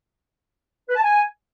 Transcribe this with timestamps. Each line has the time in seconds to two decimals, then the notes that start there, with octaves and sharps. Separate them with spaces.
0.89 B4
0.96 A5
1.03 G#5